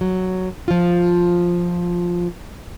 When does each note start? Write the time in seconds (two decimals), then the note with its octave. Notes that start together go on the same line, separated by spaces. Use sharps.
0.01 F#3
0.68 F3 F4